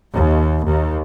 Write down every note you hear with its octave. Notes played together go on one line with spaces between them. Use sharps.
D#2
D#2